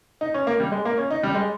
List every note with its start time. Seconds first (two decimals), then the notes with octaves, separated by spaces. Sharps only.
0.21 D#4
0.34 C#4
0.47 A#3
0.60 G3
0.72 G#3
0.85 A#3
0.98 C#4
1.11 D#4
1.23 G3
1.35 G#3